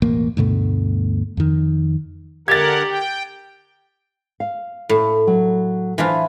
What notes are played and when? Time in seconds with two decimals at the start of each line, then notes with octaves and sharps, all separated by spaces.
0.02 E1 A1 A#3
0.37 D2 G2 B2 A3
1.37 F2 D#3
2.48 D3 G4 A#4 F#5 G#6 A6
2.88 G5
4.40 F5
4.89 A2
5.27 F#3
5.98 E3 D4 F4 C5 E5 G#5